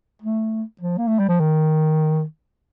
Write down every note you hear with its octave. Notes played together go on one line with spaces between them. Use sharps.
A3
F3
A#3
A3
G3
F3
D#3